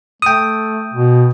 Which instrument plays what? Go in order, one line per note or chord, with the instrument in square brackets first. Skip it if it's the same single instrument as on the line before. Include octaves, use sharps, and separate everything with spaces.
[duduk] A3 [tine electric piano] G5 D#6
[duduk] B2